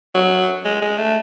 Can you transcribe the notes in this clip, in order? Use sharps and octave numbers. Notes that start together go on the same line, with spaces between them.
F#3
G#3
G#3
A3